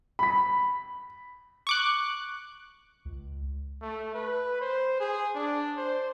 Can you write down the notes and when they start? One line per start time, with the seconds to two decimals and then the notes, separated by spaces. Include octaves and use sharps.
0.19 B5 B6
1.67 C#6 D6 F#6
3.05 C#2
3.81 A3
4.14 B4
4.61 C5
5.00 G#4
5.35 D4
5.77 C5